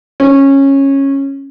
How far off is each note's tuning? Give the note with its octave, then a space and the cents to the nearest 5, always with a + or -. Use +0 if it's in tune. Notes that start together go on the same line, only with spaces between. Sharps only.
C#4 -15